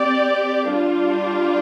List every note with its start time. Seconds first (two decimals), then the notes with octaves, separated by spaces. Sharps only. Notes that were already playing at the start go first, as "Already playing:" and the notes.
Already playing: C4 G4 D5
0.71 G3 D4 F4